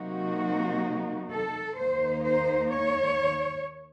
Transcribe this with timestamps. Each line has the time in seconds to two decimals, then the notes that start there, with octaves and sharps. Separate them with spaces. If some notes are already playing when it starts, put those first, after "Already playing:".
Already playing: C3 F#3 A#3 D#4 F#4
1.31 A4
1.77 D#2 D#3 A#3 D#4 C5
2.24 C5
2.72 C#5